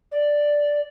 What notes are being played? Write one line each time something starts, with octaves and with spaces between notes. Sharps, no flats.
D5